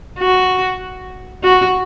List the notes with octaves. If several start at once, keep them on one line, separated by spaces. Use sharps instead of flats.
F#4
F#4